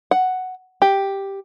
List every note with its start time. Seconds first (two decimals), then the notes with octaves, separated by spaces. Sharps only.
0.11 F#5
0.82 G4